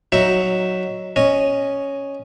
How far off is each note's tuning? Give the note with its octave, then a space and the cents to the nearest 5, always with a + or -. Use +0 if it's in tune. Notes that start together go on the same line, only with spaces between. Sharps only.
F#3 +0 D#4 +0 E5 +0
C#4 +0 D#5 -5